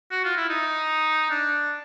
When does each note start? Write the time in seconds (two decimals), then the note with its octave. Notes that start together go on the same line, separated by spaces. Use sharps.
0.11 F#4
0.24 F4
0.37 E4
0.49 D#4
1.31 D4